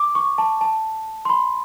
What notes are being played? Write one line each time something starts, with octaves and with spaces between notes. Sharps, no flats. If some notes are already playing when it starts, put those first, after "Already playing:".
Already playing: D6
C#6
A5
A5
C6
B5